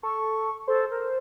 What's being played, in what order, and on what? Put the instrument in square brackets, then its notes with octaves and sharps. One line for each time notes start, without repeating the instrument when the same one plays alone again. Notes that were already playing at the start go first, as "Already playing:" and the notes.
[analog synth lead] A4 [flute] C#6
[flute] A4 [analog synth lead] C5
[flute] A#4